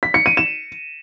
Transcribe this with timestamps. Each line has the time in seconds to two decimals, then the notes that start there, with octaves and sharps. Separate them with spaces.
0.03 B6
0.14 C#7
0.26 D#7
0.37 E7